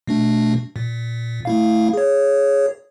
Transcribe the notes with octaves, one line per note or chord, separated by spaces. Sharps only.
B2 A3 D4
A#2
A3 E4 F5
G#4 C#5